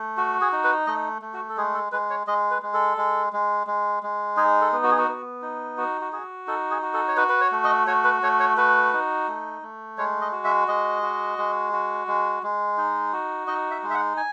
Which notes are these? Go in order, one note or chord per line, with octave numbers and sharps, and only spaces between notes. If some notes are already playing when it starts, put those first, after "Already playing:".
Already playing: A3
F#4
G#4
D#4
B4
A3 D#5
A3
F#4
A4
G#3 G#4
A4
G#3 B4
C#5
G#3 D#5
B4
G#3
A4
G#3
G#3
G#3
G#3
D#4 G#4
A4
B3
F#4
G#4
F#4
B3
D#4
F#4
F#4
F#4 G#4
D#4 A4
G#4
F#4
A4
C#5
F#4 B4
B4
C#5
A3
D#5
F#4 C#5
B4
A3 C#5
C#5
F#4 B4
D#4
A3
A3
G#3 C#5
D#5
F#4
E5
G#3 D#5
F#4
G#3
F#4
G#3
G#3
D#4
F#4
D#4 D#5
E5
G#3
E5
F#5
G#5